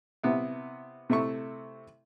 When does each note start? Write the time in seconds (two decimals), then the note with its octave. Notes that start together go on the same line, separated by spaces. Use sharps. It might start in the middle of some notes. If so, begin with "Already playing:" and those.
0.23 C3 B3 E4
1.10 C3 A3 E4 C#6